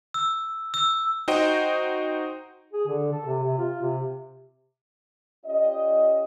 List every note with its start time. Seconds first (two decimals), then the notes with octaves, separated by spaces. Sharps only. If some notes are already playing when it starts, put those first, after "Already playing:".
0.14 E6
0.74 E6
1.28 D#4 F#4 C5 D#5 G5
2.73 G#4
2.87 D3
3.12 A4
3.27 C3
3.43 C3
3.58 F4
3.81 C3
5.45 C#4 F4 G4 D5 D#5